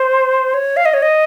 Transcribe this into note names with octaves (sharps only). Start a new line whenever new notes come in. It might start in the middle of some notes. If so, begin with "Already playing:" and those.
Already playing: C5
C#5
F5
D#5
C#5
D#5